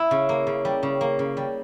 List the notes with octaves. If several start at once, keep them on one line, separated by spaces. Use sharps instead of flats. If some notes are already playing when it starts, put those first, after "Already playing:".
Already playing: E4
C#3
A#3
C#3
G3
C#3
A#3
C#3
G3